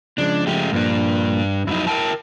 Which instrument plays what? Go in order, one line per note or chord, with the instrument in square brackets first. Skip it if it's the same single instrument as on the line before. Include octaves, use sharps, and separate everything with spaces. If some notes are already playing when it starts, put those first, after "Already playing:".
[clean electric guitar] C#3 F3 G#3 [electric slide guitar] D4
[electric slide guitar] A3 G4
[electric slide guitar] G2 D4 [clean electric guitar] A#2 F3 A#3
[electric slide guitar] F2 F#3 D#4 [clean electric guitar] E4
[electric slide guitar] A#4 G5 A5